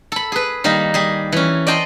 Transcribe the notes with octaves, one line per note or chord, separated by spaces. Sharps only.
A4 B5
G#4 B4
D#3 G3 A#3 D#4
G3 G#4
E3 C#4
D5 D#5 G5 A5 C6